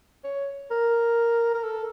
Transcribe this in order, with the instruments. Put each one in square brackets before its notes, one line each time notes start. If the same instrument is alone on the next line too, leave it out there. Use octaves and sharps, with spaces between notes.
[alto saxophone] C#5
A#4
A#4
A4